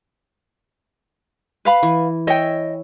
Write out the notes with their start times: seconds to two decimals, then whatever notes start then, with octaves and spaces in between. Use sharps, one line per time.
1.65 B4 F5 B5
1.83 E3
2.27 C#5 D#5 E5 G5 G#5